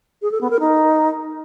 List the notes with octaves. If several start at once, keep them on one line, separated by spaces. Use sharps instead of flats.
G#4
A4
B3
A#4
D#4